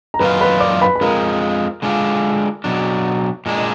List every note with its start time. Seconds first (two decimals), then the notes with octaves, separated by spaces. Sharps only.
0.14 A#5
0.20 F#2 D#3 A#3 F4 B4 B5
0.41 B4 B5
0.60 D5 D6
0.81 B4 B5
0.96 B5
1.01 F2 F3 G#3 A#4 A#5
1.82 D3 G#3 D4 F4
2.64 B2 F#3 D4
3.46 A#2 G#3 D4
3.57 D#5